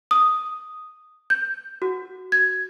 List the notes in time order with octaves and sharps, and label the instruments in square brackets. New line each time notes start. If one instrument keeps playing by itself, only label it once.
[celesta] D#6
G6
F#4
G#6